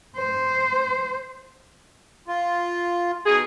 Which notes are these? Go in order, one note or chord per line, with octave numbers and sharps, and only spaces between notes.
C5
F4
B2 D#4 G#4